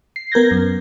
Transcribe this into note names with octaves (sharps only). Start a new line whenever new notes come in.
C7
B3 A#4 G6 G#6 A#6
F#2